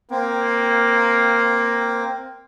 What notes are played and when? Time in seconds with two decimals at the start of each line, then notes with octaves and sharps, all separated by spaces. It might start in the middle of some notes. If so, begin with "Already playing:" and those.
0.11 A#3 C4